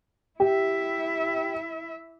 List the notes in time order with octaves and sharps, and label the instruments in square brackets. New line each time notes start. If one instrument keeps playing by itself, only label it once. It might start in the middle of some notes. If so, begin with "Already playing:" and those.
[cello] E4 E5 [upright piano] G4